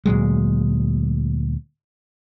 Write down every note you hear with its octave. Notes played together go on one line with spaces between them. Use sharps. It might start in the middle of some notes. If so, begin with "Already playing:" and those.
D2 A#2 F#3 G#3